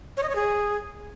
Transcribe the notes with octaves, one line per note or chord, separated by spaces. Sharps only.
C#5
D#5
C#5
G#4